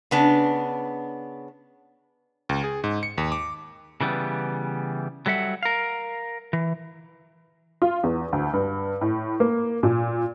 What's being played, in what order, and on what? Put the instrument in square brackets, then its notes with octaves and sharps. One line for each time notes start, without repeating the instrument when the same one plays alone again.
[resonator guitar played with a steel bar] C#3 B3 D4
[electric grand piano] C#2
G#4
G#2
C#7
D#2
D6
[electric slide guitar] C#3 E3 G3 B3
F#3 G3 A4 E5 F#5
A#4 F5
E3
[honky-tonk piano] F4
E2
D2
G2
A2
A#3
A#2